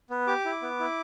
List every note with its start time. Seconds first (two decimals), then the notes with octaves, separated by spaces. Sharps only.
0.10 B3
0.27 G4 D6
0.45 E4
0.62 B3
0.80 E4